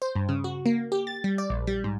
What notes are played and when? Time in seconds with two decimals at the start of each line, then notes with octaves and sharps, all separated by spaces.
0.02 C5
0.15 G2
0.29 C#3
0.44 F#4
0.66 A#3
0.92 G4
1.07 A6
1.24 G3
1.38 D5
1.50 A#1
1.67 G3
1.84 G#2